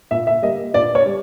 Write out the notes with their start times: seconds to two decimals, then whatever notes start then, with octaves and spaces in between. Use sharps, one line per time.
0.11 A#2 E5
0.27 E5
0.42 G3 A#3 D#5
0.74 A#2 D5
0.95 C#5
1.06 G3